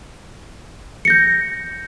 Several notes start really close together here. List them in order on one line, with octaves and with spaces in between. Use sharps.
C#7 A#6 G6